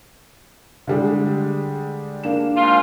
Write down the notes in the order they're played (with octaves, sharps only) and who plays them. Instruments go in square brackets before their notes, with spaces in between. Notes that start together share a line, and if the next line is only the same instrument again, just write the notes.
[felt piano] D3 G3 G#3
A#3 D4 E7
[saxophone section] G#2 F4